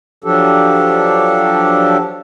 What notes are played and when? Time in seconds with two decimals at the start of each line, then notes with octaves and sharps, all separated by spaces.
0.24 F3 F#3 D4 G4 A4